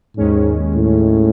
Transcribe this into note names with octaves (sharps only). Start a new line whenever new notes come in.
D#2 G#2 D#3 G#3 C#4
A2